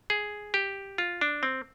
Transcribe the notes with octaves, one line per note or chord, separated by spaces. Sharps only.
G#4
G4
F4
D4
C4